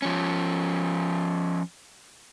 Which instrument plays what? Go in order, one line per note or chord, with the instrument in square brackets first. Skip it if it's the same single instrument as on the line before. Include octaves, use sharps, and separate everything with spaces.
[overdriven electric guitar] F3 C#4